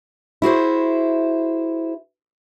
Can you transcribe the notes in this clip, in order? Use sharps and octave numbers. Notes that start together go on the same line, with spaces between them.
E4 F#4 G#4 C5